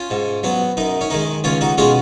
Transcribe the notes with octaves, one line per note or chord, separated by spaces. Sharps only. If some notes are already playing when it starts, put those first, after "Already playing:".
Already playing: C#4 F4
G#2
F#3 B3
F#2 D#4
C#4
D#3 G#3 D#4
C#2 C#4 F4
D#4 F#4
B2 G#3 C#4 F4 G#4